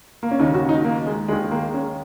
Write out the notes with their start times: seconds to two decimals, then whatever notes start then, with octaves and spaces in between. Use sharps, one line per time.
0.23 A#3
0.31 C#4
0.39 D#2 C#3 D#4
0.54 F#4
0.69 D#4
0.84 A#3
1.06 G#3
1.28 D#2 D#3 G#3
1.45 G#3
1.51 A#3
1.74 C#4